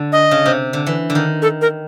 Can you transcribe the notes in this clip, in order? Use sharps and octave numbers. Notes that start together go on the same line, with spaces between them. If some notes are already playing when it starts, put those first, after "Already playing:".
Already playing: D3
D#5
C#3
C3
D3
E3
D3
D#3
A4
A#4